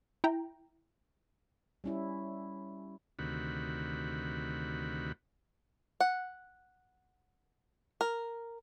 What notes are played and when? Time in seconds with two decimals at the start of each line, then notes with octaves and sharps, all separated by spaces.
0.24 E4 G5 A#5
1.84 G3 C#4 E4
3.19 D2 C3 D#3 F#4 B5
6.00 F#5
8.01 A#4